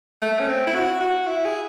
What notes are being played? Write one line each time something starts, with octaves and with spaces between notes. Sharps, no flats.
A3
C#4
C4
E4
F#4
F#4
E4
G#4